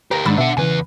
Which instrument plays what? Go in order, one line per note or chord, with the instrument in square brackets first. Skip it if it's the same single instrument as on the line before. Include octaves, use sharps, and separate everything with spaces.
[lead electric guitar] G4 A#4 [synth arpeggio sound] B4 A#5 A#6
[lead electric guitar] G#2 [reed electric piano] D#3 G#3 D4 [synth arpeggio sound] B5 E6 A6
[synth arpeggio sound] B2 [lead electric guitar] D4 F#5 [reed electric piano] E5
[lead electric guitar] E2 B4 [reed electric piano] C#3 E3 [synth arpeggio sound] G#5